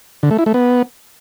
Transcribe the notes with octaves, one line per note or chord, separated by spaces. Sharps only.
D3
A3
E4
A3
B3